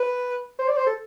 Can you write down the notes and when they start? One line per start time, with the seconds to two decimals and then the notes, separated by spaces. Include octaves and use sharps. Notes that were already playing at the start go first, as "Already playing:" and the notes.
Already playing: B4
0.59 C5
0.68 D5
0.77 C5
0.87 A4